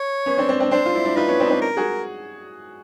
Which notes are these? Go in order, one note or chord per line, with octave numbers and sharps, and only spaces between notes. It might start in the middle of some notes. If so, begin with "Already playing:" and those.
Already playing: C#5
B3 C#4
C4 D4
C4 D4
C4 D4
C4 D4 C5
F4
D4 E4
D4 E4
D#4 F4 B4
B3 C#4
C4 D4
D#4
C4 D4
A#4
F#4 G#4